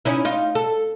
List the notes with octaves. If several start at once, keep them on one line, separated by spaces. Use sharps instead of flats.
C#4 D#4 E4
D#4 F4
A4